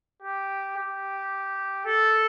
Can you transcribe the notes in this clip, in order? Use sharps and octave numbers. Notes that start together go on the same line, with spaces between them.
G4
G4
A4